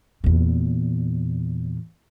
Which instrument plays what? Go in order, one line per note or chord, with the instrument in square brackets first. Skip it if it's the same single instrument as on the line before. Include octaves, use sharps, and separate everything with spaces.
[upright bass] E2 A#2